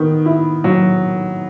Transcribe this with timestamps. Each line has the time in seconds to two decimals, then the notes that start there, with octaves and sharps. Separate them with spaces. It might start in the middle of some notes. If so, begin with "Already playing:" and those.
Already playing: D#3 B3
0.26 E4
0.64 F#3